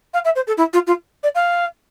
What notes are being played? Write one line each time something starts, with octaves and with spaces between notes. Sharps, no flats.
F5
E5
C5
A4
E4
F4
F4
D5
F5